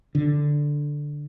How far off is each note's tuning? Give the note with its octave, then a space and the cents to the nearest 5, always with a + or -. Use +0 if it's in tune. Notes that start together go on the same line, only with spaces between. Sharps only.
D3 +0